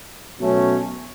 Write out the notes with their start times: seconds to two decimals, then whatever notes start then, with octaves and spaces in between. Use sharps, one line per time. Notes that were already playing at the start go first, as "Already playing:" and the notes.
0.39 B2 F#3 A3 C#4